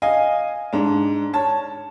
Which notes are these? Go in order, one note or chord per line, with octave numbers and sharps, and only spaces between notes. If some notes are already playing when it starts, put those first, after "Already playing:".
D#5 F5 G#5
G#2 D4
C#5 A5